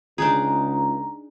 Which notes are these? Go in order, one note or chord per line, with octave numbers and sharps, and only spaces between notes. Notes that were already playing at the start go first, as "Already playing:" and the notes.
C#2 D4 D#4 G#4 A#5